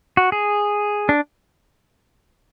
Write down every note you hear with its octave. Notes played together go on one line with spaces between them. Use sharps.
F#4
G#4
D4